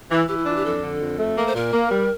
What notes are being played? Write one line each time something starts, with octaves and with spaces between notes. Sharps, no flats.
E3
E3 G4
E4
D4 F4
G4
F2 A4
D3
F2
A3
A#3 A#4
C5
A#2 A#4
A#3
G3